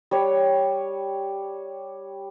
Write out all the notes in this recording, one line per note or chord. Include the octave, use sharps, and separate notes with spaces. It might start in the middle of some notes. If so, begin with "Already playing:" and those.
G3 C#5